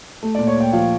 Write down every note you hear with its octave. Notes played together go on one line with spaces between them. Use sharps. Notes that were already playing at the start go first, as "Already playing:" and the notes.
A3
A#2 D5
C#5
A#2 G5
F3 F5